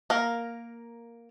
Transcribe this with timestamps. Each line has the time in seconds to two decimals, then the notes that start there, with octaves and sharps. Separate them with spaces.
0.10 A#3 A#4